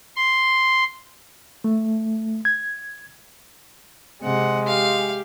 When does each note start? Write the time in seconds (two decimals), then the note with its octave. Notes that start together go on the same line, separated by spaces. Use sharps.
0.16 C6
1.64 A3
2.45 G#6
4.23 C3 G#3 F#5
4.67 G4 F5